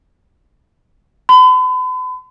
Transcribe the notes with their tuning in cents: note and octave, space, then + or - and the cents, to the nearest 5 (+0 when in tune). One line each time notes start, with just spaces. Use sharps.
B5 +40